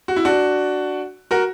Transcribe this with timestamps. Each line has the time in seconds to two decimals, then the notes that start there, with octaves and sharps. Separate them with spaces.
0.08 F#4
0.16 E4
0.25 D4 F#4
1.31 F#4 A#4